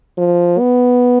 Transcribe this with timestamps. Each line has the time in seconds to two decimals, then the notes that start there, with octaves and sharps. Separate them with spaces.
0.18 F3
0.59 B3